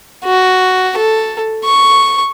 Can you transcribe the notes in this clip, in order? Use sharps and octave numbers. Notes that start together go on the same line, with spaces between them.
F#4
A4
C#6